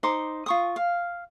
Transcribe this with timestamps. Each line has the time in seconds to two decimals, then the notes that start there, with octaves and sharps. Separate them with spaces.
0.03 D#4 C5 C6 D6
0.46 F4 C#6 D#6
0.76 F5